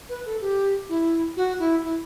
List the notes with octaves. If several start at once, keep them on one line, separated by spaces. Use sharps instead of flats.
B4
A4
G4
E4
F#4
E4
E4